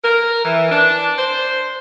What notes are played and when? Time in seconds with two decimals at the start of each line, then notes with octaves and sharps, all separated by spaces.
0.04 A#4
0.44 E3
0.71 D4
1.18 C5